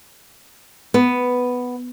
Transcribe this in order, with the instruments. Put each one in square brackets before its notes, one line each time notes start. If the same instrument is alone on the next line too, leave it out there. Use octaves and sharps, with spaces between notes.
[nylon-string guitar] B3